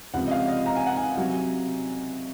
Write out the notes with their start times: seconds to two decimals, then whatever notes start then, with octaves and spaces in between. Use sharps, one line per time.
0.14 C#2 C3 F3 F#5
0.27 D#5
0.31 F5
0.48 D#5
0.66 A#5
0.76 G#5
0.86 F#5
0.97 G#5
1.18 C3 F#3